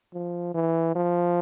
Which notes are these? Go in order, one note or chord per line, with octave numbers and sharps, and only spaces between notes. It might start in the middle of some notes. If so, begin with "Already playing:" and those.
F3
E3
F3